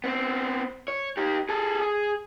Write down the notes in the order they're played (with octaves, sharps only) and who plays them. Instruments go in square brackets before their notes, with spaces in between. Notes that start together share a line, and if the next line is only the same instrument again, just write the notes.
[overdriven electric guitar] B3 C4
C#5
D#4 G4
G#4 A4
G#4